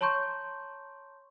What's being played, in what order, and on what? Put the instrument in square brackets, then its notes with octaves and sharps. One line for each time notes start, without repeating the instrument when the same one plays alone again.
[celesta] C#5 A5 A#5 C6 C#6 G6